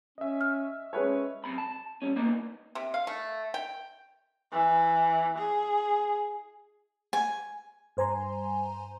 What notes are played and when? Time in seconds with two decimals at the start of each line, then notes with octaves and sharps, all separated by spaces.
0.18 C#4 D#5 E5
0.41 F6
0.93 G#3 C#4 B4 C#5
1.44 B1 C3 B5
1.58 A5
2.02 G3 C#4
2.16 A#3 B3 D4 D#4 B4 D5
2.75 C3
2.94 F5
3.07 A3
3.54 G5
4.52 E3
5.38 G#4
7.13 G#5
7.97 G2 C5 G#5 A#5 C6